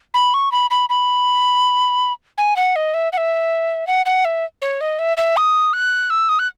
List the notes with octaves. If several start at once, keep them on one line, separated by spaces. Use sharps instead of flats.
B5
C#6
B5
B5
B5
G#5
F#5
D#5
E5
F#5
E5
F#5
F#5
E5
C#5
D#5
E5
E5
D#6
F#6
E6
D#6
F#6